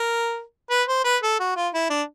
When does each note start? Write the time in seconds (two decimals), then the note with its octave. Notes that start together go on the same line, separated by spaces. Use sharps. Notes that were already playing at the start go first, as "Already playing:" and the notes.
Already playing: A#4
0.71 B4
0.88 C5
1.05 B4
1.23 A4
1.40 F#4
1.56 F4
1.74 E4
1.90 D4